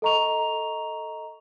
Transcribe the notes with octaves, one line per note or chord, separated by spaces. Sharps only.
A4 D#5 A#5 C#6 F7